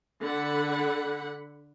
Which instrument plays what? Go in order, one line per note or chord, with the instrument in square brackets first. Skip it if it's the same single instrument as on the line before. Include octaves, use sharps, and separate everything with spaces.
[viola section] D3 F#5 B5